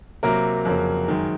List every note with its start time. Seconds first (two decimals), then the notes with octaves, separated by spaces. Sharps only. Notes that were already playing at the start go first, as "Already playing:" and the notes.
0.23 C3 F#3 A#3 A#4
0.65 F2 C#3 F#3 A#3
1.08 F#2 D#3 G#3